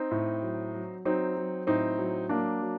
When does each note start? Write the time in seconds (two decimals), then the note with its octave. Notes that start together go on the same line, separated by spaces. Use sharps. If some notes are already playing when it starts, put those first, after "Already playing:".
Already playing: C4 D#4
0.11 A2
0.43 F#3
0.75 F#3
1.05 F#3 C4 D#4
1.37 F#3
1.67 A2 C4 D#4
1.98 F#3
2.29 F#3 A#3 D4
2.62 F#3